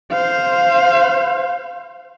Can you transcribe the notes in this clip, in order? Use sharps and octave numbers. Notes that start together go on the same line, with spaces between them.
C5 F5